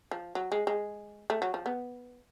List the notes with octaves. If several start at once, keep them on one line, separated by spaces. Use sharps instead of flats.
F3
F#3
G#3
G#3
A3
F#3
F3
B3